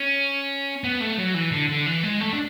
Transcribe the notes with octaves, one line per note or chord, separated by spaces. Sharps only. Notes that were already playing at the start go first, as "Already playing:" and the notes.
Already playing: C#4
B3
A3
F#3
E3
D3
D3
E3
G#3
A3
D4